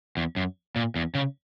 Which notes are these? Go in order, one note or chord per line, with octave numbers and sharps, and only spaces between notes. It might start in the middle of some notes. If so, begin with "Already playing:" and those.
E2
F#2
A#2
E2
C#3